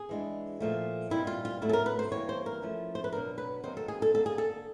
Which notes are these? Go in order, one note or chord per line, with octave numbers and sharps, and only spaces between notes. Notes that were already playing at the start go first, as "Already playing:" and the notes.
Already playing: G#4
E3 G#3 B3 D4
A#2 F3 A3
A#2 G3 C4 D#4 E4
F4
F4
A2 F#3 A3 E4
A4
A#4
B4
C5
E3 G3 A#3 C#5
C5
A#4
F3 A3 C#4 E4
C5
B4
B2 F#3 B3 D4 A#4
B4
C3 D#3 F#3 A#3 D#4 C5
A4
G#4
A4
D3 G3 A#3 A4
G#4
A4